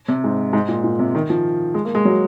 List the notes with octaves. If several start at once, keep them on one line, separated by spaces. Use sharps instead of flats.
C3
G#2
G#2
A#2
A#2
C3
D#3
F3
G#3
A#3
G#3
F#3